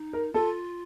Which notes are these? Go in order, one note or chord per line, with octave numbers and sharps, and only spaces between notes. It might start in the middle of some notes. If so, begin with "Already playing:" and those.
Already playing: D#4
A#4
F4 A4